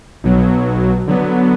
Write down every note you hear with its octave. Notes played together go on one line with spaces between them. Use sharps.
B1 B2 F#3
D3 F#3 B3